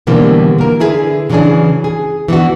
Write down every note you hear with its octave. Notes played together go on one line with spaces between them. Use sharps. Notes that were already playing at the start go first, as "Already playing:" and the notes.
B2 D3 E3 G3 A#3 C4
A#3 A#4
D3 E4 G#4 B4
C#3 E3 F#3 C#4 D4 G#4
G#4
E3 B3 D4 F#4